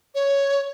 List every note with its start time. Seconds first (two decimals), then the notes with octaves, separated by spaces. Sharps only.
0.15 C#5